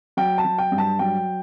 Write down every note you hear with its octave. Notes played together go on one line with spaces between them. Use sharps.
F#3 G5
A5
F#3
G5
G2
A5
F#3 G5